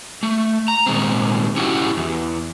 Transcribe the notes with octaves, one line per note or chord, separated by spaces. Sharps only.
A3
A#5
A#2 D#3 G#3 C4
C#4 E4 F#4 G4
E2